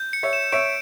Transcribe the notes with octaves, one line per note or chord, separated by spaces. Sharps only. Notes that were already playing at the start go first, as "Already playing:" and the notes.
Already playing: G6
C#7
C#5 E5
E7
C#5 E5 D7